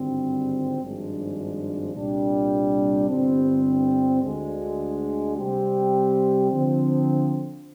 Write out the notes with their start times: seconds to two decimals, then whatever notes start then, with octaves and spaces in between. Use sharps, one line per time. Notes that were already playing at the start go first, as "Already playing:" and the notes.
Already playing: G#1 G2 D3 G3 C4
0.81 G#1 G2 F3 G#3 D4
1.95 C2 A#2 G3 D4
3.10 G1 G2 D3 G3 C4
4.23 D2 D3 G#3
5.37 C3 G3 C4 G4
6.50 D3 F3 C4